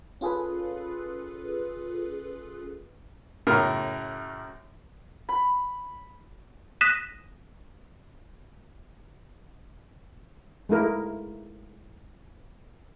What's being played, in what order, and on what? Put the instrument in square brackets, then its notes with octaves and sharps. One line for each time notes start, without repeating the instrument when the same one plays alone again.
[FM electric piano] C#4 F4 G#4 A4 B4
[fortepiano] F#2 A2 C#3 A#4 F6
[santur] B5
[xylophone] D#6 F#6 A#6 B6 D#7 E7
[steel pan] G#3 A3 E4 A#4